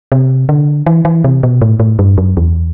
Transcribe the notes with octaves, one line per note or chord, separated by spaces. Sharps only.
C3
D3
E3
E3
C3
B2
A2
A2
G2
F#2
E2